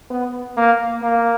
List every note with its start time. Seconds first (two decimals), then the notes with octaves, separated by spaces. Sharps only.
0.10 B3
0.57 A#3
1.02 A#3